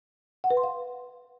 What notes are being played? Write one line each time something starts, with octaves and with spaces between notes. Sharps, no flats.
F#5
B4
C6
F5